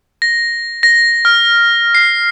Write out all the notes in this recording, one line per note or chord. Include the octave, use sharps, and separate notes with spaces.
A#6
A#6
F6
C7